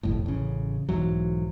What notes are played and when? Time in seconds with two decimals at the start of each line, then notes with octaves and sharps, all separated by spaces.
0.03 G1 C2 F2 A2
0.26 A1 C#3
0.89 B1 G#2 E3 F#3